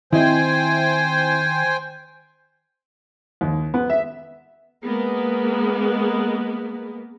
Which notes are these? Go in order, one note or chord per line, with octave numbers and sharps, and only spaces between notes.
D#3 C4 E4 C5 D#5 G5 G#5
D#2
B3
E5
G#3 A#3 B3